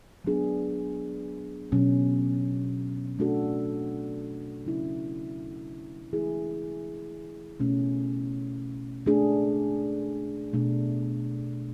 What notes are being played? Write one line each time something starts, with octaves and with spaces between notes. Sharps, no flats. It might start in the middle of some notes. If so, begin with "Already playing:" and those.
F#3 B3 D4 G#4
B2 F#3 C#4
A3 D4 F#4 A4
C#3 F#3 C#4 E4
E3 A3 E4 G#4
B2 A3 C#4
A3 D4 G#4
B2 A3 D4